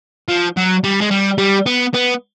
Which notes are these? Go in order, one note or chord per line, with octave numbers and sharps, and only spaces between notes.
F3
F#3
G3
G#3
G3
G3
B3
B3